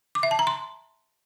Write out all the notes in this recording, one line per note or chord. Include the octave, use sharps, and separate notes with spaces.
D6
E5
A5
A#5
C6